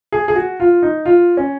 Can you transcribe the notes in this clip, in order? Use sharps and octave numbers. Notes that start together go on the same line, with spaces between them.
G#4
G#4
F#4
F4
D#4
F4
C#4